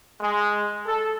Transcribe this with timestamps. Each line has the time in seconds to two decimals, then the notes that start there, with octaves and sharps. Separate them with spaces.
0.21 G#3
0.86 A4